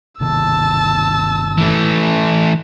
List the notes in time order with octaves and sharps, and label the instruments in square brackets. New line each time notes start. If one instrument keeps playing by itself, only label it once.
[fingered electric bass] G1 C3 D#3 [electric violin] A5 E6
[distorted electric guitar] E3 A3